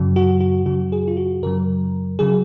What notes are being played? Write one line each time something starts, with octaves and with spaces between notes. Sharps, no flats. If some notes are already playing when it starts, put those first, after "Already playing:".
Already playing: F#2 C#3 F#3
F#4
F#4
F#2 C#3 F#3 F#4
G#4
F4
F#4
F#2 C#3 F#3 A#4
C#3 F#3 G#4